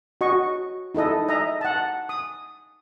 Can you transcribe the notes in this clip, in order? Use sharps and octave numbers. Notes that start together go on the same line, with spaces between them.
F#4 D#5 C#6
D#4 E4 A4 D#5
D#5 E5 A#5
F#5 A5
D#6